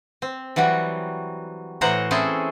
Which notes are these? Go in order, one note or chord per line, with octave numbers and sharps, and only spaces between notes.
C4
E3 F#3 G3 F#4
A2 E3 C5 C#5 F#5 A#5
C4 C#4 E4 G#4 A4 C5